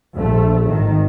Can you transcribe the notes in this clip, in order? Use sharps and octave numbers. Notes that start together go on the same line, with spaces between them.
A#1 A3
G#1 D#3